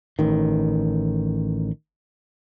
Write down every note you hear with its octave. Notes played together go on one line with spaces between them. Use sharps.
A1 D#3